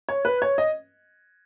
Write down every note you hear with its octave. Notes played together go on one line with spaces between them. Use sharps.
C#5
B4
C#5
D#5